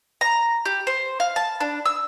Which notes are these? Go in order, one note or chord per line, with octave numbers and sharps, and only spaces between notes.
A#5
G4
C5
F5
A5
D4
E6